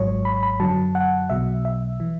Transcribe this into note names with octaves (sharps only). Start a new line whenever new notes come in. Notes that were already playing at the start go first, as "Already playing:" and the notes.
Already playing: G#1 G#2 F#3 C#5
B5
B5
F#2 D3 F#3 A5
F#5
B1 B2 F#3 E5
E5
E3